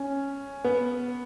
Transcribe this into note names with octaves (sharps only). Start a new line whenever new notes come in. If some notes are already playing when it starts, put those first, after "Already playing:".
Already playing: C#4
B3